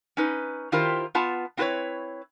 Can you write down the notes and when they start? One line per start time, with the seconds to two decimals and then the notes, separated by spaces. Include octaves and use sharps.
0.17 C#4 D#4 B4
0.72 D#3 E4 F4 G4 A#4 C5
1.15 B3 F4 A5
1.57 C4 E4 F#4 A4 B4 C#5